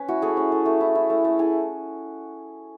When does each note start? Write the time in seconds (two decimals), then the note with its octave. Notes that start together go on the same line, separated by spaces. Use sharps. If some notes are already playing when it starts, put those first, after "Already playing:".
Already playing: C#4 B4
0.08 E4 F#4
0.22 A3 G#4
0.37 C#4
0.52 A3
0.66 A3
0.80 E4
0.95 E4
1.10 A3
1.25 A3
1.39 E4 G#4